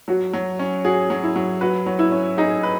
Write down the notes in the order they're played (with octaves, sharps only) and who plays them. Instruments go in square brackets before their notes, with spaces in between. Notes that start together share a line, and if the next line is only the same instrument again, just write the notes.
[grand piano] F#3 [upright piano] F#4
[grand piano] F#3
C#4
[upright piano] F#4 [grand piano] G#4
[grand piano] F#3
[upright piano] E4
[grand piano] F#3
[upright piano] F#4 [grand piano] B4
[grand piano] F#3
[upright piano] E4
[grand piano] C#4
[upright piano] D#4 [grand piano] G#4
[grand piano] B4